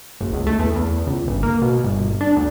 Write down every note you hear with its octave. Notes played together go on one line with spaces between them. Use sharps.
F#1
C#2
A3
E2
E2
C#2
G1
A#3
B2
G1
D4
D2